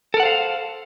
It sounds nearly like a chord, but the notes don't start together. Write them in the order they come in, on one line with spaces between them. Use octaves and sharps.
A4 A#4 F#5 C5 F5